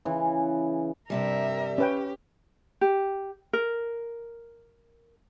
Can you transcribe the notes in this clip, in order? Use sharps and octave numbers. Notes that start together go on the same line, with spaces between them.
C#3 E3
G2 C3 G3 A#4 E5
C#4 G4 B4 G5
G4
A#4